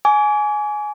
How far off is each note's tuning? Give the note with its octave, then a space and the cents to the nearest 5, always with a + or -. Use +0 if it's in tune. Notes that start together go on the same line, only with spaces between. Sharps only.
G#5 +15 D6 -40